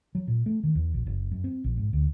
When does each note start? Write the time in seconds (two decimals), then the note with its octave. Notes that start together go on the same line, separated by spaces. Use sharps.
0.15 F#3
0.28 A#2
0.46 A3
0.63 D#3
0.75 E2
0.94 A#1
1.06 F#1
1.32 F#2
1.44 C4
1.64 A#1
1.77 G#2
1.93 D2